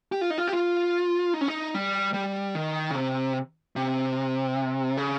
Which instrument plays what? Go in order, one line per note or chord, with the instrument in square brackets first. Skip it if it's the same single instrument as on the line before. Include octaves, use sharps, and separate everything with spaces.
[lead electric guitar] G4
F4
D#4
F4
G4
F4
D#4
C#4
D#4
G3
G3
D#3
C#3
C3
C3
C#3